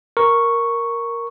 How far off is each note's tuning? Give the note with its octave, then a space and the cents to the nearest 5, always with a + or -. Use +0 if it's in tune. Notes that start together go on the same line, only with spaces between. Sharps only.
A#4 +0 C#6 +0